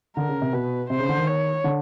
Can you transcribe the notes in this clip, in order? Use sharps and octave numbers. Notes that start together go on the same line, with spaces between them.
D3 A#4
C#3
C3
B2 B4
C3 C5
C#3
D3
D#3
C#5
D3